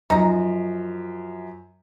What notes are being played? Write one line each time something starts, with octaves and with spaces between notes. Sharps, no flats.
F#2 F3 D#4 A#5